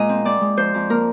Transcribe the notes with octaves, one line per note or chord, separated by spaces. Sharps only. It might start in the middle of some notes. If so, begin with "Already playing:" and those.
Already playing: A#2 G#3 D#5 F5 G#5
C4
C4 D5
G#3
F2 C5
F2
A#3 A#4